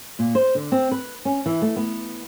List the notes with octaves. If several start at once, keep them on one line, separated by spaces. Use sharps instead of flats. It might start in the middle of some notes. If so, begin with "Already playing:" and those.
A#2
C5
D3
C4
B4
C#4
E3
A3
B3